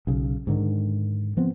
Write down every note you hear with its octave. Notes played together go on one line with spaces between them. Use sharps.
B1 C#3
G#2 D3 D#3
F3 B3 C4